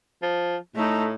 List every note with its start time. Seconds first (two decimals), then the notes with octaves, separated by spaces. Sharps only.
0.22 F3
0.76 A2 A3 D#4